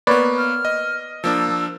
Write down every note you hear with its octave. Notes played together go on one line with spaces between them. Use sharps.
A#3 B3 B4 C#5 D5
F6
D#5
F3 A#3 D4 E6